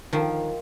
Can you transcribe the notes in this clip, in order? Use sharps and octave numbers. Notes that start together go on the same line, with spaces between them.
D#3 F3